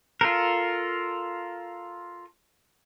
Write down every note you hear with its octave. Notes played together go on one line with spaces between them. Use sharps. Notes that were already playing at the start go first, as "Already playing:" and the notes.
F4 A4 A#4